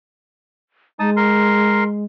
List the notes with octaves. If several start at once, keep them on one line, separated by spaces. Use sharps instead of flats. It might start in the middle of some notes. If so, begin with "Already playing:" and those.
G#3 D#4 A5 D#6
A#4 C6